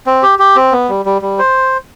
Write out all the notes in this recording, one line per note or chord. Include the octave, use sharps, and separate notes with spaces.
C4
G4
G4
C4
B3
G3
G3
G3
C5